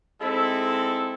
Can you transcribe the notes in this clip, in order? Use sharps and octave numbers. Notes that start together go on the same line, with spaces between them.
G#3 C4 D#4 E4 A4